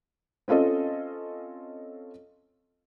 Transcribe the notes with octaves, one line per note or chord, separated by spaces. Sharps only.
C4 C#4 F4 A4 D#5